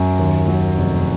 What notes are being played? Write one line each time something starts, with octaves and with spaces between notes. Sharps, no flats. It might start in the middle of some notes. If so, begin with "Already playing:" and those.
Already playing: F#2
D#2
F#3
F1